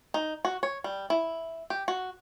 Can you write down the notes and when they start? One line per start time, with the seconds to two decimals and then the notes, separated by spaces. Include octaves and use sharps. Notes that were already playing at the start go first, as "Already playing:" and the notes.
0.14 D#4
0.45 F#4
0.63 C#5
0.84 G3
1.10 E4
1.70 G4
1.88 F#4